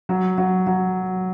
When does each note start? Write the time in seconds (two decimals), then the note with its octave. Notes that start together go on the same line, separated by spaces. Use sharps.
0.09 F#3
0.38 F#3
0.67 F#3